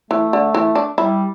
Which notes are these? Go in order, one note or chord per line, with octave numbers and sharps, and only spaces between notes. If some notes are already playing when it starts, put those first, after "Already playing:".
E3 A3
D3
E3
D4
G3 E4